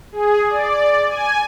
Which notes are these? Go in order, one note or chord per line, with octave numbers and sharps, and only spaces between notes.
G#4
D5
G#5